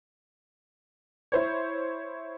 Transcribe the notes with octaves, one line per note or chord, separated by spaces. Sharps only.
E4 C5 C#5